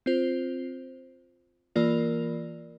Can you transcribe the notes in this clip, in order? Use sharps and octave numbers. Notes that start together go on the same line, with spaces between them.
C4 F4 C5
E3 A#3 F4 A#4 D5